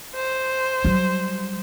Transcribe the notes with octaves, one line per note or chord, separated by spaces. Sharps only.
C5
F#3 G3